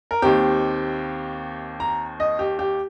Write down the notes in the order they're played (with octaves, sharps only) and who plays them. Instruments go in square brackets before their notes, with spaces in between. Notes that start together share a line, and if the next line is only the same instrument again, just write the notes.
[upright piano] A#4
D#2 D#3 C4 G4
A#5
D#5
G4
G4